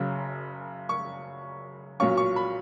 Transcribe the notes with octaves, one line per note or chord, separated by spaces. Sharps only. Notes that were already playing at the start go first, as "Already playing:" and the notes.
Already playing: F#1 F#2 C#3
C#6
B1 A#2 F#3 C#4 F4 C#6
C#6
B5